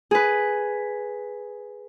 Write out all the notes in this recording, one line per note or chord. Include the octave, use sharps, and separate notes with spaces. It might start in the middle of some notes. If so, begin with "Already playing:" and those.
G#4 B4